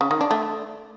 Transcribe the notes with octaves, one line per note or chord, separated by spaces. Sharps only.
C#3
D#3
D4
A3